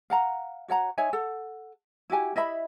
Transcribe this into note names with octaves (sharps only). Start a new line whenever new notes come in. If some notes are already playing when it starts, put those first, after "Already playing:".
F5 F#5 A#5
F#4 C#5 F#5 A#5
D#4 C#5 E5 G#5
A4 F#5
E4 F#4 G4 G#5
E4 D#5 E5 B5